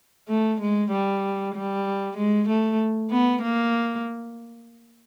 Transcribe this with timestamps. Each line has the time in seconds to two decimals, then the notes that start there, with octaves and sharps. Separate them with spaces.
0.29 A3
0.60 G#3
0.91 G3
1.55 G3
2.17 G#3
2.48 A3
3.11 B3
3.42 A#3